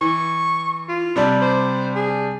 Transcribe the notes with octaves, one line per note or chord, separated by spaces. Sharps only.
E3 C#6
F4
C3 G3 D4
C5
G#4